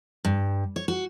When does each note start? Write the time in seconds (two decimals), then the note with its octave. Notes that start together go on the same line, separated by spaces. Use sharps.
0.25 G2
0.76 C#5
0.88 F#4